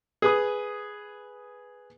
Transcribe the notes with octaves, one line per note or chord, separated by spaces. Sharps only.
G#4 B4 D#6